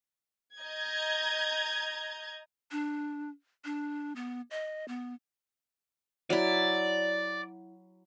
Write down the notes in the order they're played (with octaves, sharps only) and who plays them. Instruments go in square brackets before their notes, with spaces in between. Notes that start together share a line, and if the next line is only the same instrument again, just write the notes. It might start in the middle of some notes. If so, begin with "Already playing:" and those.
[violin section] D#5 A#5 G6 G#6
[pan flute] D4
D4
B3
D#5
B3
[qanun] F#3 E4 [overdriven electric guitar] D5